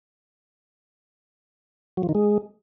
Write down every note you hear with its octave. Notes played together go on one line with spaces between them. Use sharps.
F#3
F3
D#3
G#3